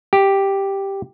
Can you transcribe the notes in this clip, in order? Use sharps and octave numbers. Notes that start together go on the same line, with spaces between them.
G4